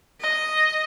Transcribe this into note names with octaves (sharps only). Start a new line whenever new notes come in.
D#5